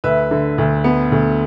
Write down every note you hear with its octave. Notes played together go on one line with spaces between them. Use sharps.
D2 B4 E5
D3
D2
B3
D2